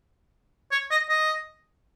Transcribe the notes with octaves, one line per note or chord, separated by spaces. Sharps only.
C#5
D#5
D#5